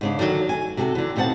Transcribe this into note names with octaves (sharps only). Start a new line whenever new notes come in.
G#2 C#3 D4
D3 D#3 F#3
G#5
C3 F#4 G#4 A4
D3 E3
D#2 B2 C4 F#5 A5